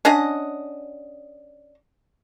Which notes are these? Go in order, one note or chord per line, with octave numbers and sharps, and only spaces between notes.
C#4 D4 D#5 F#5